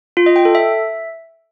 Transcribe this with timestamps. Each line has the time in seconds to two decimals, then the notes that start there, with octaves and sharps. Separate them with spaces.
0.17 F4
0.26 D#5
0.36 G5
0.45 A4
0.55 E5